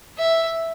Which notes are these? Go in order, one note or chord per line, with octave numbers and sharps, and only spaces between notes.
E5